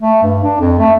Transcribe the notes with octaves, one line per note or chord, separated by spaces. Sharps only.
A3
G2
D4
F2
A3